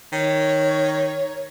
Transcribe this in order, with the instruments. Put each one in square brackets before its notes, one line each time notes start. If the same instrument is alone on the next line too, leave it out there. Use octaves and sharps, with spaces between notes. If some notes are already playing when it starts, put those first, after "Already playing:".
[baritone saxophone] D#3 [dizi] C#5